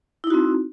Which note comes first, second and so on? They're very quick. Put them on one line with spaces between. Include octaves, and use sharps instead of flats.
E4 D#4 F#4 C4